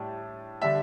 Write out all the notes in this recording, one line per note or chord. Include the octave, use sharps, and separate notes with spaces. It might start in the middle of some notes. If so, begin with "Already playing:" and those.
Already playing: A2 G3 D4
D3 G3 D4 E5